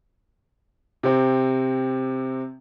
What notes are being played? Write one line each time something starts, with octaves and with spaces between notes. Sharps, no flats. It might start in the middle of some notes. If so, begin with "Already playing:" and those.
C3 C4